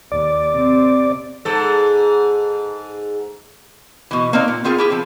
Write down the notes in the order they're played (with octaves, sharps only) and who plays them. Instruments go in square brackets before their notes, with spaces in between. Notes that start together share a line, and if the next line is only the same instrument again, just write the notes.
[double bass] D#2 [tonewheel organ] D5
[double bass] C3 C4
[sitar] G#2 A4
[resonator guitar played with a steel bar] B2 E3
A#3 C4 D#4 A#4 D5
A#2
B3 C4 F4 G#4 A#4
E4 G4 G#4
F3 C4